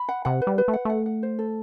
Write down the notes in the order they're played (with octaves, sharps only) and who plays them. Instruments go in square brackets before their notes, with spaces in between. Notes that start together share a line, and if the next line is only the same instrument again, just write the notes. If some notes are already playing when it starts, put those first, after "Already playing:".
Already playing: [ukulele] B5
F#5
[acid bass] C3 [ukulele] F#5
[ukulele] B4
[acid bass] G3
[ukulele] B4
[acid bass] A3
[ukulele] F#5
[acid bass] A3 [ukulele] F#5
[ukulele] F#5
C5
A4